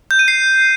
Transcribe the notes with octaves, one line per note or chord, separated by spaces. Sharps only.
G6
D#7
C7